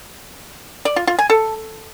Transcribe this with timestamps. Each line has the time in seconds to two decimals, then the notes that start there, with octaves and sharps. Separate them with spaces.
0.85 D5
0.96 F4
1.07 F4
1.19 G#5
1.30 A4